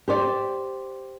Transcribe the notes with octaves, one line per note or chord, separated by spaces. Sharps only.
G4 C5 D5